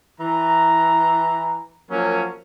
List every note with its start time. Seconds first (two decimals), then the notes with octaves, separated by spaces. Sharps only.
0.20 E3 A#5
1.91 F3 F#3 A#3 C#4 A#4